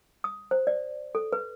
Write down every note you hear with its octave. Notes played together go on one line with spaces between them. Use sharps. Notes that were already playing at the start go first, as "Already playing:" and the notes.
D#6
C5
D5
A4
B4